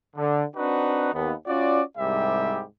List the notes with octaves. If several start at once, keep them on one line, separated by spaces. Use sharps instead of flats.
D3
C4 D4 D#4 F#4 B4
D#2 B3
C#4 F4 F#4 D5
C2 G#2 G3 G4 E5